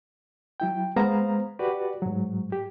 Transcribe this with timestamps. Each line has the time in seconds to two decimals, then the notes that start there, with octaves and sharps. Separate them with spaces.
0.60 F#3 E4 G5
0.96 G#3 B3 C5 F5 A#5
1.59 F#4 G4 B4 D5
2.02 G#2 F#3
2.52 G4